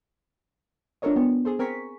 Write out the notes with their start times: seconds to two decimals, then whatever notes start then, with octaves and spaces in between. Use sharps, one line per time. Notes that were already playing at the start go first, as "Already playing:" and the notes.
1.02 D4 F4 A4 A#4 C#5 D#5
1.16 B3
1.45 G#4 A4 C5
1.59 C4 A#4 G#5 C#6 B6